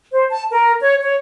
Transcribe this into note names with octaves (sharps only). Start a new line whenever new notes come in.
C5
A5
A#4
C#5
C#5